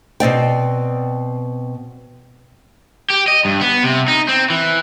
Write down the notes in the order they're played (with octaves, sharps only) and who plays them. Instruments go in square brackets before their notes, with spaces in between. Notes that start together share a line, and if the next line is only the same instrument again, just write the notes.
[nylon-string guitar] B2 C4 D5 G5
[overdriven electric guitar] G4
D#5
G2
B3
C3
D#4
C4
E3